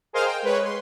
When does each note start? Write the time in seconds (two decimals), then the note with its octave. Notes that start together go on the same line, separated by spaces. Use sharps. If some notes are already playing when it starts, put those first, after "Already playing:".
0.13 G#4 A#4 C5 D#5 F5 F6
0.25 G5
0.42 G#3 B4 C#5
0.64 C6